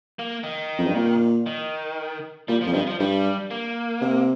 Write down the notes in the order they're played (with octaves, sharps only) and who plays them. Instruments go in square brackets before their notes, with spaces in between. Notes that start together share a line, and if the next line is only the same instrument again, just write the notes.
[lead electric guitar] A#3
D#3
[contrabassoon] F2
G2
A#2
[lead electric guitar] D#3
[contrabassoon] A#2 [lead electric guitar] G3
[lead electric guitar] F3
[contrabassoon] F2
[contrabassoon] G2 [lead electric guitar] D#3
[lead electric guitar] F3
[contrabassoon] G2 [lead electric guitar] G3
[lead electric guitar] A#3
[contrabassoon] C3